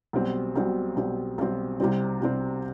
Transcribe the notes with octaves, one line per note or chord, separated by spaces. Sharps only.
B1 B2 G3 C4
B1 B2 G3 C4
B1 B2 G3 C4
B1 B2 G3 C4
C2 C3 G3 C4
C2 C3 G3 C4